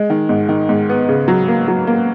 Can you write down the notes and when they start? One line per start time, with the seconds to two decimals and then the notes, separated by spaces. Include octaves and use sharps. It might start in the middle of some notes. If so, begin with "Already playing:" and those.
Already playing: G#3
0.10 D#3
0.29 G#2
0.49 D#3
0.69 G#2
0.89 B3
1.09 C#3
1.28 F#3
1.48 A#3
1.68 F#3
1.87 A#3